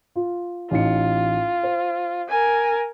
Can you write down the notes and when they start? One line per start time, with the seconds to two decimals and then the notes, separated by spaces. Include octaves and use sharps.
0.16 F4
0.71 A1 D#4 F4 C#7
1.63 C5
2.29 A#4 G#5